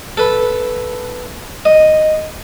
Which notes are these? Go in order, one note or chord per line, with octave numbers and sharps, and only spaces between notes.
A4 B4
D#5